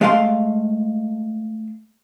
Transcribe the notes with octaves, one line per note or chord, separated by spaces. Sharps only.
G#3 A3 F5 G5 C6